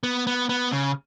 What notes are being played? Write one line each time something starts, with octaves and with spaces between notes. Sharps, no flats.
B3
B3
B3
C#3